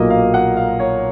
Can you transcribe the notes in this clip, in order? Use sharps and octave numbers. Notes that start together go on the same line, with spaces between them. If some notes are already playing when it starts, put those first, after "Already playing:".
Already playing: B1 A#2 F#3 A#3 D#5
F5
F#5
F5
C#5